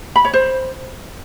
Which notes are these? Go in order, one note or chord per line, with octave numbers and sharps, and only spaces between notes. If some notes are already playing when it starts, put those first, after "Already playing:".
B5
C#5
C5